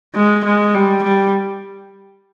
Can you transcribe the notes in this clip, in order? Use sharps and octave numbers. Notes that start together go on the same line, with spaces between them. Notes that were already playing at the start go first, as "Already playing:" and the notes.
G#3
G#3
G3
G3